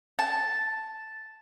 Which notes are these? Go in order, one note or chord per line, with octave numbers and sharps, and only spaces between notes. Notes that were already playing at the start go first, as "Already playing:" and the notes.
A5